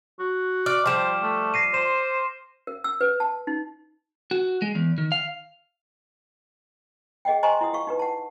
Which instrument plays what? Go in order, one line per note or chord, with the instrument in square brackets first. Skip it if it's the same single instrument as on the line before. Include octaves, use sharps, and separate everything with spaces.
[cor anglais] F#4
[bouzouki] D5 [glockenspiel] D6 F6
[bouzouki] F3 G3 [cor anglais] C5 [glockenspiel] D6 E7
[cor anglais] A3
[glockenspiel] A#6 C7 D#7
[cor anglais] C5 [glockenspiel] C6 E7
[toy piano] A#4
E6
B4
A5
D#4
[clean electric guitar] F#4
G#3
E2
D#3
F5
[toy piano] G#4 D#5 F#5 G5
C5 D#5 G#5 A#5 C6 C#6
E4 F#5 D#6
G4 F5 C#6
D#4 G4 B4
F#5 A5